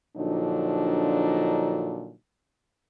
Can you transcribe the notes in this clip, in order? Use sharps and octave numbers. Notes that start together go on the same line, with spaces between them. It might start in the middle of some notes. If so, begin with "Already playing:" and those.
A#2 D3 F3 F#3 D4 D#4